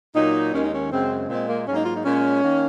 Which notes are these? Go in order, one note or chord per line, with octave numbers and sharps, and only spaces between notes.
A#2 F#3 A#3 D#4
D#2 D#3 G#3 C#4
D#4
C#4
F#2 C#3 G#3 C4
A#2 G#3 C4
A#3
G#2 F#3 A#3 C#4
D#4
F4
D#4
A#2 G#3 C#4
D#3 A#3